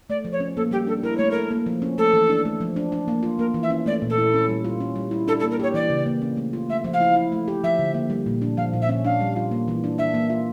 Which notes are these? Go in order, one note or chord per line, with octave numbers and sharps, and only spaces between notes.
A3 D5
F3
C#5
C#4
A#3 A4
G3 G4
D4 A4
E4 A#4
A3 C#5
A4 A#4
A#3
F3
C#4
A3 A4
E3
D4
A3
F3
D4
D4
A#3
F4
A#3 A#4
E3
E5
C#4
A3 D5
A#2
A4
E4
C#4
G3
F4
C#4
G3
E4
D4 A4
A4
A#3
A#4
G4 C#5
E3 D5
C#3
A#3
C#4
A3
F4
A3 E5
F3
F5
E4
E4
A3
G4
F3 E5
D3
A#3
G3
A#2
D4
F3 F5
A#2
E5
C#4
D4 F5
G3
F4
A#3
E3
D4
D4 E5
A#3
F4